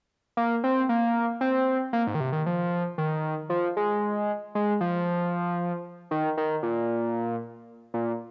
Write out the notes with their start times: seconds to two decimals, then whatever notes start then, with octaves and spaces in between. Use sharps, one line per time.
0.37 A#3
0.64 C4
0.89 A#3
1.41 C4
1.93 A#3
2.07 G#2
2.15 D#3
2.20 C3
2.32 D#3
2.46 F3
2.98 D#3
3.50 F3
3.77 G#3
4.55 G#3
4.81 F3
6.11 D#3
6.37 D#3
6.63 A#2
7.94 A#2